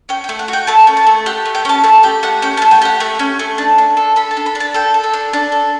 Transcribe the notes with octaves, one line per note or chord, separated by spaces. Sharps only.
C#4 G5
G5
A3
F#5
F#4
G5
A3 A5
C#4
A5
A3
G4 F#5
A3
G5
C#4 A5
A3 A5
G4 G5
A3 F#5
C#4 G5
A5
A3
G5
G4 F#5
A3
C#4
A3
D4
D4
A4
A4 B5
A5
D4
B5
D4
A5
A4 G5
A4
E5
D4
D4 D5
A4